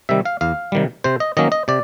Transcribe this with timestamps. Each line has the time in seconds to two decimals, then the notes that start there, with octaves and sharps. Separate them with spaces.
0.09 C3 D#3 G3 E5
0.25 F5
0.41 E2 F5
0.72 C3 D#3 G3
1.04 C3 C5
1.20 D#5
1.37 D#3 F#3 A#3 C#4 D#5
1.52 D#5
1.68 C3 D5